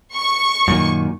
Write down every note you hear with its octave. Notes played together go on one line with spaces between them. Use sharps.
C#6
F#2 A#2 D#3